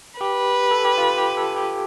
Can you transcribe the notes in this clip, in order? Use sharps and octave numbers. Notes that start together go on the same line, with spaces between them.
G4 B4
A4
G4
F4
G4
A4
G4